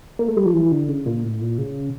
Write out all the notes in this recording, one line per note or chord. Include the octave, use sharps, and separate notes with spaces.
A#3
A3
G3
F3
E3
D3
C#3
A#2
A2
A#2
C#3